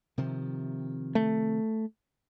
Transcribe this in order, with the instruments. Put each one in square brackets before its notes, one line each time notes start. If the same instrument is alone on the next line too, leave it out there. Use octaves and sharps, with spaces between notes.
[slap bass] C3 D#3 F3
[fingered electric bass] A3